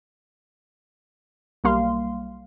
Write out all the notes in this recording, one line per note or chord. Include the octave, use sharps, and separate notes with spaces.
B1 G3 A#3 F5 C6